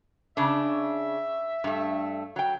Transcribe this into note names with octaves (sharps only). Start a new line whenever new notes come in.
C#3 D4 E5
G2 A3
F#3 G5